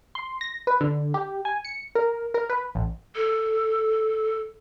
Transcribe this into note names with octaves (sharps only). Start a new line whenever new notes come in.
C6
A#6
B4
D3
G4
G#5
C#7
A#4
A#4
B4
A1
A4